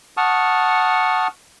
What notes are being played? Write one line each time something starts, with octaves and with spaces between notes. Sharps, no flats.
F#5 A5 C#6 D#6 F6